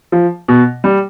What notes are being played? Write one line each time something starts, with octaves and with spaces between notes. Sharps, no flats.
F3
B2
G3